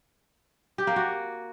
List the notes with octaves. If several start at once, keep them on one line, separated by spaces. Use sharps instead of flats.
G4
A#3
F#4